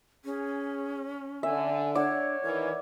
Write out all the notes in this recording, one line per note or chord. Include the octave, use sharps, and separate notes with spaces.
C#4 G#4
D3 E5 G#5
D4 C#5 D5 F#5
D#3 E3 A#4